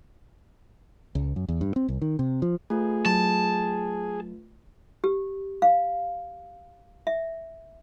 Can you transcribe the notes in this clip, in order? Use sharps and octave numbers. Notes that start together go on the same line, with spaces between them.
C#2
F#2
E2
G2
C4
C2
D#3
C3
F3
A3 F4 G#4 B4
F#3 A5
G4
F5
E5